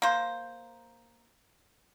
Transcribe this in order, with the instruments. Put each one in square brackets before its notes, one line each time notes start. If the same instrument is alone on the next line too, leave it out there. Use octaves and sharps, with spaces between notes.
[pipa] A#3 C5